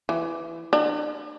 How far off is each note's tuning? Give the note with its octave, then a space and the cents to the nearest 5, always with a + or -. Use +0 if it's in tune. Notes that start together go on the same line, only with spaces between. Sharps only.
E3 +15
D4 +40